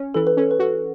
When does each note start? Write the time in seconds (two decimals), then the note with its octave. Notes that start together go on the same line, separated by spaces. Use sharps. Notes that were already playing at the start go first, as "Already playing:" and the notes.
Already playing: C#4
0.14 E3 A4
0.27 B4
0.37 C#4 A4
0.51 B4
0.59 F#4 A4